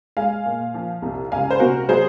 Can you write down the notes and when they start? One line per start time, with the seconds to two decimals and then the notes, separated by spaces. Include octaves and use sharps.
0.17 G#3 F5 G#5
0.46 A#2
0.74 F3
1.02 C2
1.32 C#2 F5 G#5
1.51 C5
1.60 C3 F#4 A#4
1.89 F#3 G#4 C5